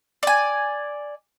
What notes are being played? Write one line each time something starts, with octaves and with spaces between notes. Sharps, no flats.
D5 G#5